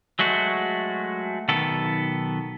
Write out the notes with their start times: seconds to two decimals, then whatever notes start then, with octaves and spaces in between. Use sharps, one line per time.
0.19 F#3 G#3 A3 F#4
1.49 B1 D#3 B3 A4